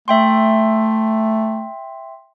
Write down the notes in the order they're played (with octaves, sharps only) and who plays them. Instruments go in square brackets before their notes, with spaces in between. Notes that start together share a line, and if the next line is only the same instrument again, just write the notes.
[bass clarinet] A3 [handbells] E5 G5 C6